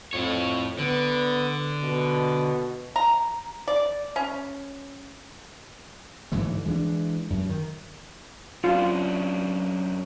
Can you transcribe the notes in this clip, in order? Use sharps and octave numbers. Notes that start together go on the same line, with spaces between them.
F2 A2 C#5
D3 B3
B2
A#5
D5
C#4
G1 G#2 E3 A3
E3 G#3 B3 D4
F#2
D#3
F#2 C#4 D4 F4